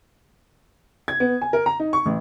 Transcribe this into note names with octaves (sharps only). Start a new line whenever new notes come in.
G#6
B3
G#5
A#4
A#5
D#4
C#6
A1